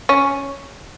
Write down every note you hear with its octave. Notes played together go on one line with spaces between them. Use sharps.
C#4